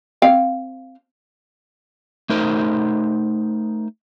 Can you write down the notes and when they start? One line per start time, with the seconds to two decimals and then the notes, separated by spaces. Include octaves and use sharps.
0.22 C4 F5 G5
2.30 A3 D#4 A#4 C5